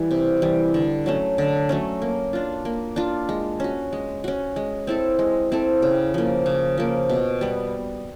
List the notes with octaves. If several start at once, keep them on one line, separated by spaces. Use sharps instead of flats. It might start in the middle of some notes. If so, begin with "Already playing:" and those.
Already playing: E3 G3
C3
E3 G3
D3
F#3 A3 C#4
D3
F#3 A3 C#4
A#3
D4 F4
A#3
D4 F4
G#3
C#4 F#4
G#3
C#4 F#4
G#3
C4 E4 A4
G#3
C4 E4 A4
C#3
F3 A#3
C#3
F3 A#3
B2
G3 B3